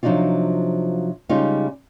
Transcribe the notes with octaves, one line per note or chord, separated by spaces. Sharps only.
C3 F3 F#3 D4 D#4 F4
C#3 G3 G#3 D#4 F4